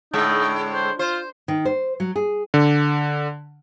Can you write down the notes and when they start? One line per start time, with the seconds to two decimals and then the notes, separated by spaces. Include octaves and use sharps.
0.13 A2 D3 G#3 D#4
0.74 C5
0.99 F4 C5
1.48 D#3
1.65 C5
2.00 F#3
2.16 G#4
2.54 D3